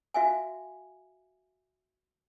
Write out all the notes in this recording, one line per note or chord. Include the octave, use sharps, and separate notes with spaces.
F#4 E5 F5 G#5